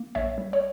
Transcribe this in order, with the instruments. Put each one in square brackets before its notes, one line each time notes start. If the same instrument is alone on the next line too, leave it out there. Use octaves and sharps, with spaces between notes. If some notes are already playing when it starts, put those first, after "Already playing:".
Already playing: [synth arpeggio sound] A#3
A#1 C#5 E5
G3
C#5